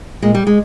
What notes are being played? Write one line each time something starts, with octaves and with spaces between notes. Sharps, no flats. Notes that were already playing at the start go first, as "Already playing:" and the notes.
A#2 G#3
G3
G#3